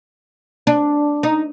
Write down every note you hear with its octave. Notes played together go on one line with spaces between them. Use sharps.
D4
D#4